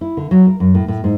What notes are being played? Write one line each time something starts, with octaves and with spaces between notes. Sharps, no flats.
E4
D3
F#3
A#4
F#2
A2
A2
G#2